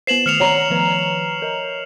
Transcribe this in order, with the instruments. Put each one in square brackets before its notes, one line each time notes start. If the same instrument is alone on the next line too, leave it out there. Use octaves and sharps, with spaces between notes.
[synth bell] B3 B4 C5 [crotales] C7 E7 F#7
[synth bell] D#3 D#6 [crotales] F6 C#7 F7
[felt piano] C#5 A#5 [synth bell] D5 F#5
[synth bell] D#3 F3 B4
A#4 D#5